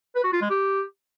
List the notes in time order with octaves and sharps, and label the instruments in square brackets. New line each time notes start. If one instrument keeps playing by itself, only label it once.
[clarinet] B4
F#4
F4
G#3
G4